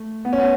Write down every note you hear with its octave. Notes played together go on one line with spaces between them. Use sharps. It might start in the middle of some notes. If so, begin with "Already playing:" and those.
Already playing: A3
B3
C#4
B3